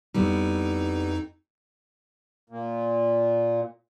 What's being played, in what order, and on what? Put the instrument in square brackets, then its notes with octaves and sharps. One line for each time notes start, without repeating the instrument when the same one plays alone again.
[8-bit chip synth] F2 D#4 [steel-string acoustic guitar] G3 B3 E4
[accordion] A#2